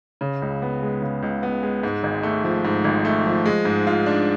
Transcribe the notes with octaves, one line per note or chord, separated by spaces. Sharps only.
C#3
C#2
B3
G#3
C#3
C#2
B3
G#3
G#2
G#1
A3
F3
G#2
G#1
A3
F3
G#3
G#2
F4
D4